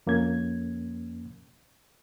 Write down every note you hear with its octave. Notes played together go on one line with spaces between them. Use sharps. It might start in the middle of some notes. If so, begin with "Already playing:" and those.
F2 A#3 C#4 G#6